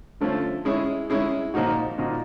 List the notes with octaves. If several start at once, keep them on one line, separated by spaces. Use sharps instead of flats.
D3 F3 A3 C#4 F4
G#3 C#4 E4 G#4
G#3 C#4 E4 G#4
A#2 F3 A#3 D#4 F#4
A#2 F3 A#3 D#4 F#4